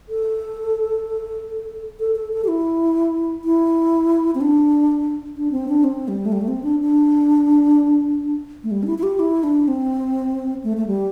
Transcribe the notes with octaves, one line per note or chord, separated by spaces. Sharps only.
A4
A4
A4
A4
G4
E4
E4
C4
D4
D4
C4
D4
C4
G3
A3
G3
A3
C4
D4
D4
A3
G3
D4
E4
E4
G4
E4
D4
C4
A3
A3
G3